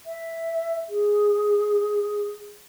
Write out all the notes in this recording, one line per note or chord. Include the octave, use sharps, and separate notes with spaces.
E5
G#4